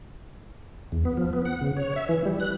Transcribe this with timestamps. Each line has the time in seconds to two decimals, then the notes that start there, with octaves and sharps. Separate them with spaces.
0.92 E2
1.05 B3
1.17 F3
1.33 B3
1.45 F#5
1.61 C#3
1.77 C#5
1.96 E5
2.09 E3
2.25 G3
2.40 F#6